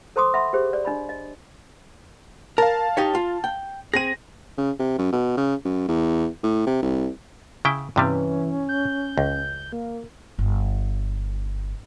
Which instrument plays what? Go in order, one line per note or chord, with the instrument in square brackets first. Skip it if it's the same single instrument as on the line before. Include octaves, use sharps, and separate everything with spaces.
[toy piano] A4 C5 A#5 C6 D6 D#6
E5 F#5 B5 C6
G4 G#4 C5
D5
D4 D#5 B5
D#5
[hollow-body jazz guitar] A#4 [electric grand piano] F5 A5
[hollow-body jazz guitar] D#4 G4 C#5
F4
G5
[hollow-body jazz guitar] C4 G#4 [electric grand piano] A#6 D#7
[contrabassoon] C#3
C3
F#2
B2
C#3
F#2
E2
A2
C3
C2
[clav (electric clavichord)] C#3 E4 G5
[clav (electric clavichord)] G2 C3 G3 [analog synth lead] E3 [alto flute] C#4
[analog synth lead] G6
[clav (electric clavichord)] C#2
[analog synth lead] A#3
[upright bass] G1